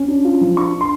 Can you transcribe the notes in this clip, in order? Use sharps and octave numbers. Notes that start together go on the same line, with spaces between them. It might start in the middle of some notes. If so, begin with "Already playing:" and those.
Already playing: C#4
D4
F4
F3
D4 C#6
D4
C6